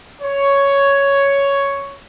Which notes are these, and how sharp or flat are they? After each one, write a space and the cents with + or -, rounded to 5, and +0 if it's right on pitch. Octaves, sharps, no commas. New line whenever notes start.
C#5 +5